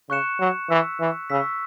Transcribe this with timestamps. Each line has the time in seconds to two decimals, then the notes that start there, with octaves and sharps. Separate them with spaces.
0.09 C#3 C#6 F#6 C#7 E7
0.40 F#3
0.69 E3 C#6 E6 B6
1.00 E3
1.30 C#3 C#6 E6 B6